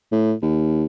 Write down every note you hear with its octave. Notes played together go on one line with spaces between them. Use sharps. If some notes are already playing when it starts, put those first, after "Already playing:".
A2
D#2